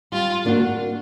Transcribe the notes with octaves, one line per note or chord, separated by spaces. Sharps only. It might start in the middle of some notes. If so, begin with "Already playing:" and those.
G3 F4
A#3 D4 F#4